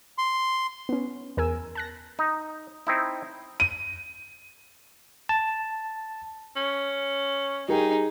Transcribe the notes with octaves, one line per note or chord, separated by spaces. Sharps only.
C6
B3 C#4
E2 A#4 G#5 E6
A5 F#6 A#6
D#4
C4 D#4 E4
D#7
A5
C#4
G3 D#4 G#4 A#4 G5